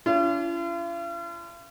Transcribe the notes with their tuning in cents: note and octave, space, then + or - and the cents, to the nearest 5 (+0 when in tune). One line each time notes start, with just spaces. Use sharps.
D4 -45 F4 -45